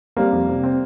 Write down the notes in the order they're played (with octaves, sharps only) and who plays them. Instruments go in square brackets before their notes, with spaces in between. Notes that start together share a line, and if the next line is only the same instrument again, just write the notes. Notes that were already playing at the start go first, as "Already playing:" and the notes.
[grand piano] G3 A#3 [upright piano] C4
[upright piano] F2
C3
C4